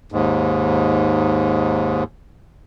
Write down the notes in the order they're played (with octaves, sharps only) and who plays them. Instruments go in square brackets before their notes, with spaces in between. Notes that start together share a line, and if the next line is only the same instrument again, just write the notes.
[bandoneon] D#2 G#2